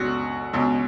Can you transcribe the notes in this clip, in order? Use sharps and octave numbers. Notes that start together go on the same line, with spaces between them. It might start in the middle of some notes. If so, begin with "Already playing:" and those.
Already playing: C#2 B2 F#4
C#2 B2